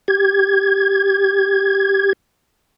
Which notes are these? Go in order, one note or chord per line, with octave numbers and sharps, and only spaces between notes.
G4 G#6